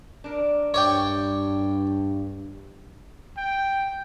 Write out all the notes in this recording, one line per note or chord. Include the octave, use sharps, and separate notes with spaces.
D4 A#4
G2 C#5 D5 G5
G5